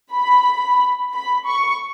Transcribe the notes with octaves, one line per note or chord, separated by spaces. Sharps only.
B5
B5
C#6